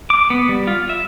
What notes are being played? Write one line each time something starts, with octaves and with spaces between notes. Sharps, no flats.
D6
B3
G3
F4
E5